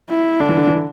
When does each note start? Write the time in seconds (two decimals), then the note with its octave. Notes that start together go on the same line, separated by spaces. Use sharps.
0.10 E4
0.40 D3 D4
0.49 E3
0.57 D3
0.67 E3
0.76 D3